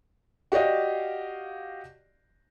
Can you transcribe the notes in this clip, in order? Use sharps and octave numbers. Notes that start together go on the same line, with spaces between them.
F#4 G4 D5 D#5 F5